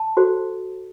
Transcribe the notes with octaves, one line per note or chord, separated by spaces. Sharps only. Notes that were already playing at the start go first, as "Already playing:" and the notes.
Already playing: A5
F#4 A4 C5